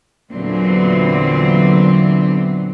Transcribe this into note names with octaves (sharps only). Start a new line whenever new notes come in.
E2 A#2 D3 F#3 B3 C4